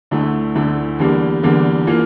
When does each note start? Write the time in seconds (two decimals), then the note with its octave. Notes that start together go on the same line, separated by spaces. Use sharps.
0.11 D2 D3 A3 E4
0.55 D2 D3 A3 E4
0.99 E2 D3 G3 A#3
1.43 E2 D3 G3 A#3
1.87 E3 A#3 F4